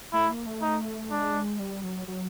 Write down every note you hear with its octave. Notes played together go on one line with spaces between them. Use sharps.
A3 E4
A#3
A3
D#4
G#3 D4
G3
F#3
F#3